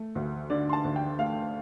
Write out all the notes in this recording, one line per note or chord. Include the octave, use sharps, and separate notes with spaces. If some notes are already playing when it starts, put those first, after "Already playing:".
Already playing: A3
D2
D3 D5
C6
A5
D2
G5
A3 F5